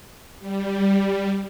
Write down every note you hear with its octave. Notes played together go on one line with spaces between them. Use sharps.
G3